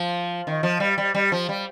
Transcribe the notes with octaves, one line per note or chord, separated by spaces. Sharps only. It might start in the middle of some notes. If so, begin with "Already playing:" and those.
Already playing: F3
D#3
F3
G3
G3
G3
F3
G3